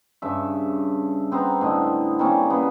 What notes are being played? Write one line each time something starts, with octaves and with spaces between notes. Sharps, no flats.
G2 C#3 E5
B3 C4 C5 A#5
A2 D3 D#5
G3 A#3 C4 C#4
C#3 B3 G#4